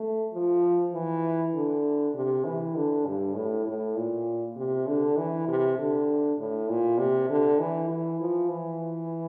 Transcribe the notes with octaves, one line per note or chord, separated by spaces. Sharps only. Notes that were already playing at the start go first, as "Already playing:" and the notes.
Already playing: A3
F3
E3
D3
C3
E3
D3
G2
A2
A2
A#2
C3
D3
E3
C3
D3
A2
A#2
C3
D3
E3
E3
F3
E3